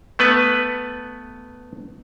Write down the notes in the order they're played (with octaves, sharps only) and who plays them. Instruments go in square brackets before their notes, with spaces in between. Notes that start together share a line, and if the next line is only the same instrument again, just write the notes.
[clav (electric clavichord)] A3 B3 B4